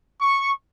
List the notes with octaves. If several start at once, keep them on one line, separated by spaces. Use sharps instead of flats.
C#6